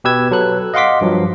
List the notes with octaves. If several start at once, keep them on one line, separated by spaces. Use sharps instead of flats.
B2 G4 B4 E6 G#6
F#3 A4 B4 F#6
D#5 F5 F#5 C6 D6 B6
G2 F3 F#3